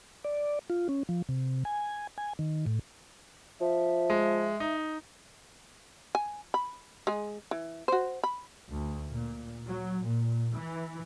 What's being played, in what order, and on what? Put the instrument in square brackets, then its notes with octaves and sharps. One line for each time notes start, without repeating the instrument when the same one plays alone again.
[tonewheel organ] D5
F4
C#4
F3
C3
G#5
G#5
D#3
A2
[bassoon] F3 [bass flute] E5
[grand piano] G#3
D#4
[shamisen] G#5
B5
G#3 G#4
E3
F#4 C5
B5
[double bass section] D2
A#2
F#3
A#2
E3